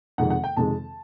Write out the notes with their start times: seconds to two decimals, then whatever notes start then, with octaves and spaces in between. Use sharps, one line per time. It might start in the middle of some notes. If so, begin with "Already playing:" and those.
0.18 F2 C3 D#3 G#3 F#5
0.30 F#5
0.44 G5
0.57 F2 C3 D#3 G#3 A5